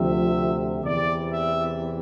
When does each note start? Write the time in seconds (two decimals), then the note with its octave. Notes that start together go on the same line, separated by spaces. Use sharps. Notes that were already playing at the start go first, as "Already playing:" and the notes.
Already playing: D2 C3 F3 E5
0.84 E2 C3 E3 D5
1.32 E5